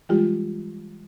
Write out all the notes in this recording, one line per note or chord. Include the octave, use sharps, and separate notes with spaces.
E3 G3 G#3 F4 G4